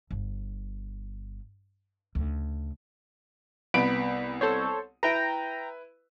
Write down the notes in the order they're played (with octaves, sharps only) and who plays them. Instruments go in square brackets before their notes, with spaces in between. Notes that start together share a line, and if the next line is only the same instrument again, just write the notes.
[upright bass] G1
D2 C#3
[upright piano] C2 B3 D7 [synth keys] B5
[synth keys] A4 C5 C#5
[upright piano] E4 B4 [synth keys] G5 A#5